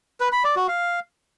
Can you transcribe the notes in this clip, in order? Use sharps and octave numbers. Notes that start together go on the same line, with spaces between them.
B4
B5
D5
F#4
F5